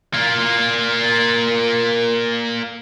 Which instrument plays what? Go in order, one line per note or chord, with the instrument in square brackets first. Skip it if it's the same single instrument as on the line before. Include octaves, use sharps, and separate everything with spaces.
[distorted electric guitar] A#3 F4